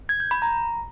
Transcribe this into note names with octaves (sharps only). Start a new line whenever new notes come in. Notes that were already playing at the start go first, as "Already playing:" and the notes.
G#6
G6
B5
A#5